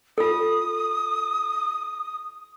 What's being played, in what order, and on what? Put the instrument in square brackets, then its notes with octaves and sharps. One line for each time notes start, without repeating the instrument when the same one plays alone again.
[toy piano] F4 A4 [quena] D#6